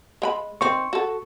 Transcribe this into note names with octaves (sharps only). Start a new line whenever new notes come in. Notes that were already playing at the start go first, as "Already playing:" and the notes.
G#3 G5 B5
D#3 C4 C#6
F#4 A4